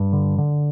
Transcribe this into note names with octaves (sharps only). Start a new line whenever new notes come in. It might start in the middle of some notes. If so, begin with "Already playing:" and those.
Already playing: G2
D3
D3